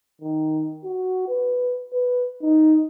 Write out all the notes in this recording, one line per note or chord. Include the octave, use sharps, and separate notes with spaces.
D#3
F#4
B4
B4
D#4